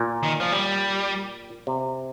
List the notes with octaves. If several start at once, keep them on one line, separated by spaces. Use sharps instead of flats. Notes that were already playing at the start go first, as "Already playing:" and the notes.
Already playing: A#2
D#3
F3
G3
C3